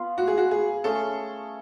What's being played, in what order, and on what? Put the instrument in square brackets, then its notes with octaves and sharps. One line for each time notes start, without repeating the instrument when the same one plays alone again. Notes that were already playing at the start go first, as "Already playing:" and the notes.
Already playing: [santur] B3 F4 B4 F5
[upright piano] F#4
G#4
F#4
G#4
[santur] A3 C#4 G#4 [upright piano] A4